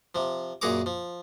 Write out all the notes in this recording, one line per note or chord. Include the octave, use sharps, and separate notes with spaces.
C3 F3
F#2 A#2 G#4 F#5 A#5 D6
F3